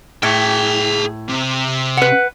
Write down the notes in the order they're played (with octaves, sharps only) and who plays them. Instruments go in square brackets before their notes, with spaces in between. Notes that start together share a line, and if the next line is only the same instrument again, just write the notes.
[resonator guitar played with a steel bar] A2 [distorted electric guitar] G#4 G5
[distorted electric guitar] C3
[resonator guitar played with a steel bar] B4 F#5